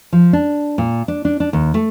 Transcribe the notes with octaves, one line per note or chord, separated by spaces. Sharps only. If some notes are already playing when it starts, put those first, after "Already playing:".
F3
D4
A#2
D4
D4
D4
D#2
A3